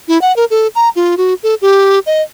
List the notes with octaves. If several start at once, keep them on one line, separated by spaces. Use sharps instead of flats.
E4
F#5
A#4
A4
A#5
F4
F#4
A4
G4
D#5